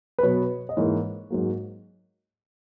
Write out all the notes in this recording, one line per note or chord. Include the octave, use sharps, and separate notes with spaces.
B4
B2 F#3 B3 C#5
D#5
G#2 E3 A#3 C#5
G#2 F#3 A#3